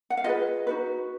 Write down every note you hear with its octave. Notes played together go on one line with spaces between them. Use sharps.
F#5
F5
F4 G#4 B4 D#5
D#4 F#4 B4